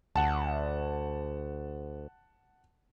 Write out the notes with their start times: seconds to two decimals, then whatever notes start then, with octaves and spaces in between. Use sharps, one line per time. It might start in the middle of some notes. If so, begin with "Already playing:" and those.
0.16 D2 F#5 A5